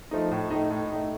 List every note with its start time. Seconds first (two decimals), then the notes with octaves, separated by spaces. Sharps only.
0.11 F3 A3 D#4
0.32 A2
0.51 A3 D#4
0.71 A2
0.92 A3 D#4